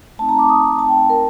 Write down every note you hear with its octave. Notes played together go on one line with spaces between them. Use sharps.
A3 C4 D#4 A5
A#5
D6
D#6
A#5
A3 C4 D#4 A5
G5
A5
A#4